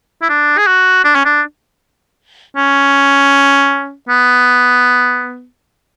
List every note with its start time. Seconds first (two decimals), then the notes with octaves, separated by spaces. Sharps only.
0.22 E4
0.29 D4
0.58 G#4
0.67 F#4
1.04 D4
1.15 C#4
1.25 D4
2.57 C#4
4.09 B3